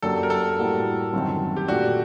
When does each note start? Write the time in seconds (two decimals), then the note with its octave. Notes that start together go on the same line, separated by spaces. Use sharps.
0.02 F#2 F#3 A#3 D4 G4 A4
0.23 A#4
0.30 A4
0.59 A2 G3 A#3 F#4
1.13 G1 F#2 D#3 F#3 C4
1.57 G4
1.68 A#2 A3 D4 F#4 G4